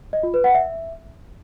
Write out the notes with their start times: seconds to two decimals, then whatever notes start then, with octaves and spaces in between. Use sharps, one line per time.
0.13 D#5
0.23 F4
0.34 B4
0.44 F#5
0.55 E5